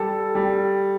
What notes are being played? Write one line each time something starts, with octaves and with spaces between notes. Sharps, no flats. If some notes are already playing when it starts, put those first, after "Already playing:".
Already playing: G3 A4
G3